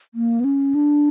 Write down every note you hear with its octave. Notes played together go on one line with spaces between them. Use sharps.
A#3
B3
C#4
D4